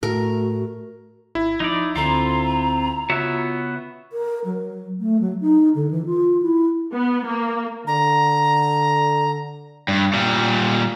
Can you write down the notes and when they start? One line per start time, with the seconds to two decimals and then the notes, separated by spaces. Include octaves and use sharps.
0.03 A2 A3 F#4 A#4
1.35 G#1 E4
1.60 F3 D#4 D5
1.96 D2 D3 C4 F4 A4 A#5
3.10 C#3 B3 F4 F#4 C#5 E5
4.13 A#4
4.45 F#3
5.00 A3
5.21 F#3
5.41 D#4
5.75 D3
5.91 E3
6.06 F4
6.42 E4
6.95 B3
7.26 A#3
7.87 D3 A#5
9.88 G2
10.13 A#2 G3